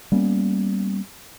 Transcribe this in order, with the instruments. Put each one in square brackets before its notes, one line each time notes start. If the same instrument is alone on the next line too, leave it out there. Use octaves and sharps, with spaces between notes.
[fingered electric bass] G3 A#3 B3 C#4